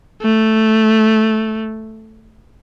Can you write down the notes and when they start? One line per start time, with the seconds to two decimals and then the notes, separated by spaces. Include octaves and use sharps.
0.22 A3